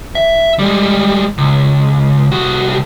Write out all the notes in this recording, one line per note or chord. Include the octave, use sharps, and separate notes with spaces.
E5
G3 G#3
C#2
C2 F#4